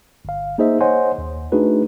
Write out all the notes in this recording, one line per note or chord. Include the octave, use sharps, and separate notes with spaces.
G1 F5
A#3 D#4 G#4 C5 D#5 E5
C5 C#5 D#5 F#5 G#5 C6
D#2
A3 D4 D#4 F#4 G#4 B4